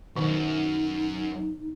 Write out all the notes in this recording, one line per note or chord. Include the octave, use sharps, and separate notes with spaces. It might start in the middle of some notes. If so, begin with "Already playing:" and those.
C2 F#2 B2 D#3 D#4